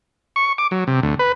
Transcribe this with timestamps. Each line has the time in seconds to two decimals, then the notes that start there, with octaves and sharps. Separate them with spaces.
0.36 C#6
0.58 D6
0.71 F#3
0.87 C3
1.03 D2
1.19 B4